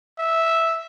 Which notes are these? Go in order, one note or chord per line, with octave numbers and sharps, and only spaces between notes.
E5